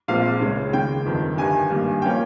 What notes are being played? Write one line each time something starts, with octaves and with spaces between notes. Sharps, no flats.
A#1 A#2 G#3 C4 F5
C#2 C#3 G#3 C#4
D#2 C#3 G#3 G5
G1 F2 D#3
G1 G2 D#3 G3 G#5
G#1 G2 G3 A#3
F3 A#3 C#4 G5